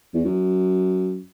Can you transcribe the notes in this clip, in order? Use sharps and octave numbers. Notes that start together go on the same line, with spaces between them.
E2
F#2